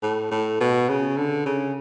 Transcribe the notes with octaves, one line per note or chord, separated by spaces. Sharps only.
A2
A2
B2
C#3
D3
C#3